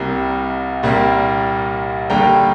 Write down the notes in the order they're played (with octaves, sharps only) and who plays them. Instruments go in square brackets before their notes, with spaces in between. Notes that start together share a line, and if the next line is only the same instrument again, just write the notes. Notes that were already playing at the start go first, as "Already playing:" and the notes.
Already playing: [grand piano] C2 C3 G3 A#3
C2 A#2 G3 A#3
D#2 D3 G3 A#3 G5 A#5